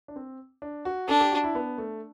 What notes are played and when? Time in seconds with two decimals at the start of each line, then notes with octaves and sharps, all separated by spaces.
0.08 D4
0.16 C4
0.62 D4
0.85 F#4
1.08 D4 A4
1.20 G4
1.32 F#4
1.44 E4
1.55 B3
1.78 A3